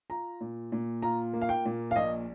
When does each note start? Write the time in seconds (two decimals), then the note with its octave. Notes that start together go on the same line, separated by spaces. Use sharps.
0.10 F4 A#5
0.41 A#2
0.72 A#2
1.02 F4 A#5
1.33 A#3
1.42 F5
1.49 G5
1.66 A#2
1.91 F5
1.96 A#1 D#5